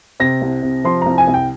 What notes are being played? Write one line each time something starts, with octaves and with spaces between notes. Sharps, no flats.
C3 A#6
C2
C3
F3 C6
C2 A#5
G#5
C2
G5